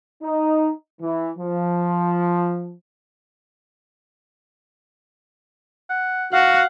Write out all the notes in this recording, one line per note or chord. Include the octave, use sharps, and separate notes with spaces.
D#4
E3
F3
F#5
F#4 F5 F#5